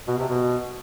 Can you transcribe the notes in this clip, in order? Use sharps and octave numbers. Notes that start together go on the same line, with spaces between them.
B2
C3
B2